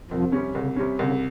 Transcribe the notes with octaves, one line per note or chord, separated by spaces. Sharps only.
C2 F2 F3
C3 G3 C#4
C2 C#3
C3 G3 C#4
C2 C#3